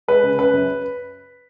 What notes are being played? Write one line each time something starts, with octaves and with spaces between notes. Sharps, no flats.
G#3 B4
C#3
C#3 B4
F#2